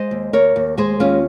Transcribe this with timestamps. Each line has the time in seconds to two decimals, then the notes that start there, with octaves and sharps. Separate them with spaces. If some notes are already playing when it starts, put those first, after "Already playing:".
Already playing: G#3 C5 D#5
0.11 D#2
0.33 D#2 A#4 C#5
0.56 D#2
0.77 G#3 G#4 C5
1.00 D#2 C#4 F4